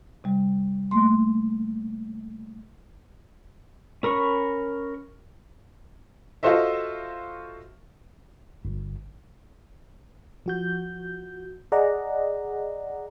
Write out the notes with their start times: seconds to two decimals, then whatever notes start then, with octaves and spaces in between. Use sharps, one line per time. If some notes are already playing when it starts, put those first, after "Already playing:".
0.24 C3 G3
0.91 A3 A#3 C6
4.03 C#4 A#4 B5 C#6
6.43 F4 F#4 A4 C5 D#5 E5
8.65 G1
10.46 F3 F#4 G6
11.72 G#4 D5 D#5 F#5 A#5